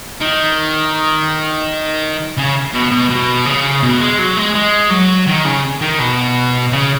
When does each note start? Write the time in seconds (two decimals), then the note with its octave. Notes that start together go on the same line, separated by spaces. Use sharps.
0.20 D#3
2.37 C#3
2.74 B2
2.91 B2
3.10 B2
3.46 C#3
3.83 B2
4.01 G#3
4.18 F#3
4.37 G#3
4.55 G#3
4.91 F#3
5.27 D#3
5.45 C#3
5.81 D#3
5.99 B2
6.72 C#3